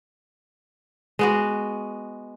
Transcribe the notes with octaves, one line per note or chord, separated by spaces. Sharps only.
G#3 B3 F#4